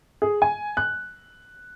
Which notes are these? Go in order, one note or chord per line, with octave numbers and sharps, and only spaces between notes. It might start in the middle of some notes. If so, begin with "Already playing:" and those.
G#4
G#5
F#6